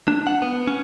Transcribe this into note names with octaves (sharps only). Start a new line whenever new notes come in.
D4
F#5
B3
C#4